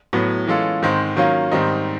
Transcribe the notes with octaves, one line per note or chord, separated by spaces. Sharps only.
A2 F#3 B3
E3 G#3 C#4 F4 A4
G#2 D#3 G#3 C4
D#3 F#3 A#3 C#4 F4
G#2 D#3 G3 C4 D#4